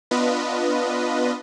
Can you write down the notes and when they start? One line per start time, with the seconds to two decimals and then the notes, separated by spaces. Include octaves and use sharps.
0.11 B3 D4 F4 B4 D#5